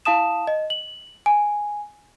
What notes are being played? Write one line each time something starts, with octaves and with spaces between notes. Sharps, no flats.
E4 F5 A5 D#6 E7
D#5
F#7
G#5